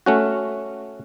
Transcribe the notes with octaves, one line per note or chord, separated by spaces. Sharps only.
A3 C#4 F#4